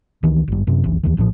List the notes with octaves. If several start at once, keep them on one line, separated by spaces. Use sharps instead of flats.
C#2 D#3 E3
G#1 G2
F#2 C3
F1 B1 E3
D#2 D#3 E3
A#1 A2 C3 F3